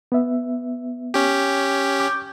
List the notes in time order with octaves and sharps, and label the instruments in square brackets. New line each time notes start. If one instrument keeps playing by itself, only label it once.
[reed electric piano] B3 E5
[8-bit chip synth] C#4 G4
[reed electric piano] D6 G6